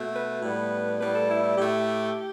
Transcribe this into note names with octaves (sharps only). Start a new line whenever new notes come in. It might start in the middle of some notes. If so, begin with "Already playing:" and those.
Already playing: B2 A3
B4
A2 G3 B3
A2 G3 B3 B4
A4
E4
E4
A2 A3 G4